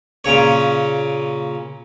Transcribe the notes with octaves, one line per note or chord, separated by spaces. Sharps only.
A#2 C#3 C#5